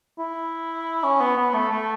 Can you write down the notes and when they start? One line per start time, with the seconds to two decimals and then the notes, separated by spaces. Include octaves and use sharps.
0.19 E4
1.04 C#4
1.20 B3
1.37 B3
1.54 A3
1.72 A3